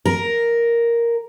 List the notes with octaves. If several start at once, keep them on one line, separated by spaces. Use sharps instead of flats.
A#4